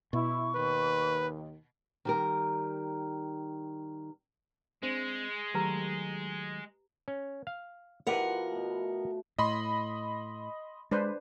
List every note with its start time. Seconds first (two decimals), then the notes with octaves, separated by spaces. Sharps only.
0.13 B2 E4 C#6
0.55 D#2 D#3 B4
2.05 D#3 G3 A#4
4.83 G#3 C4 D4 C5
5.54 D#3 F#3 A3 G4 B4 A#5
7.08 C#4
7.47 F5
8.07 B2 F3 E4 G4 A#4 B4 F#5
8.51 B2 A3
9.38 A2 D#5 B5 C6
10.91 G#3 D4 B4 C5